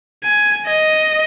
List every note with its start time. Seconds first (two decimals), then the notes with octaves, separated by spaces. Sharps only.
0.24 G#5
0.67 D#5